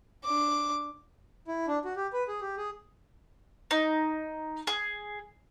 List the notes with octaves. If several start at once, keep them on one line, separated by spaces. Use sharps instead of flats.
D4 D6
E4
D4
F#4
G4
B4
G#4
G4
G#4
D#4
G#4